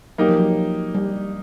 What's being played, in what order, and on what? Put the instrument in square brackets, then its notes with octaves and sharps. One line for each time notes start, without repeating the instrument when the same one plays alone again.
[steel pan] F#3 [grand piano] A#3 D#4 G4
[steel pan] F3
F#3
G3